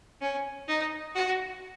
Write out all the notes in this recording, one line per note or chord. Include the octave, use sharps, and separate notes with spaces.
C#4
D#4
F#4